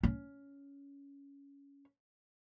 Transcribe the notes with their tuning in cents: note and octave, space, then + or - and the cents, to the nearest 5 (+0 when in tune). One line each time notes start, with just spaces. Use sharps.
C#4 +15